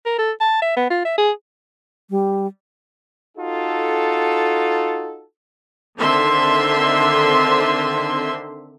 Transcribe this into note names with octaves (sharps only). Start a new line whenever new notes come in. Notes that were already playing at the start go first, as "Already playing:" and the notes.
A#4
A4
A5
E5
B3
F4
E5
G#4
G3
D#4 F4 F#4 A4
D3 D#3 C4 E5 C6